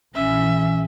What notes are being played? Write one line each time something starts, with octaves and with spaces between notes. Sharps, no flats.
A#1 E3 C#4 E5